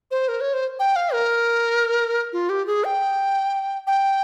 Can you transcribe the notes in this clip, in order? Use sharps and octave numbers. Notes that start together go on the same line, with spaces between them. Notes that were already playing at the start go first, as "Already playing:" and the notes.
C5
A#4
C#5
C5
G5
F5
A#4
F4
G4
G#4
G5
G5